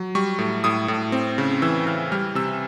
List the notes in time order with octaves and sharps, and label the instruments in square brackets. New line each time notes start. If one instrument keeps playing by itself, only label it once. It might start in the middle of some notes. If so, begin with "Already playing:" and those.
Already playing: [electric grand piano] F#3
G3 C#6
A2
A2 D#6
A2
C4
C#3
E3 E6
E3 F6
G3 F6
C3 E6